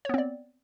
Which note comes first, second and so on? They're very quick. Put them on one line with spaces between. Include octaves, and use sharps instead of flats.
C#5 B3 C4 D5